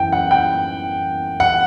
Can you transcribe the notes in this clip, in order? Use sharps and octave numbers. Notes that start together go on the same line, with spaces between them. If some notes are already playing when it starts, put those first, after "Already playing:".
Already playing: F#2 E3 G5
F#5
G5
F#5